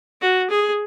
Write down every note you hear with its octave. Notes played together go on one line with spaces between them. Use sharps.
F#4
G#4